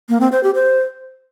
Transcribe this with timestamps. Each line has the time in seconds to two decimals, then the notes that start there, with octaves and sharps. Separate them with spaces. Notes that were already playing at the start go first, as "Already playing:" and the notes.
0.09 A#3
0.20 C4
0.32 C5
0.43 G4
0.55 C5